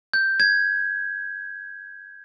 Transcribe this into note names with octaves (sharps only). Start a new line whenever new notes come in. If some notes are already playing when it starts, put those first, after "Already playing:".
G6
G#6